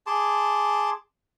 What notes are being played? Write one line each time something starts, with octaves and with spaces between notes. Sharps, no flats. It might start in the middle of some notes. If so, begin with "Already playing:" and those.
G#4 A5 C6 D6